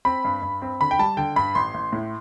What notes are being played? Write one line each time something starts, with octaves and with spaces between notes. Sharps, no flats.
C4 B5
G2
G2
C4
D3 B5
G5
G3 A5
D3 G5
G2 B5
A1 C6
A1
A2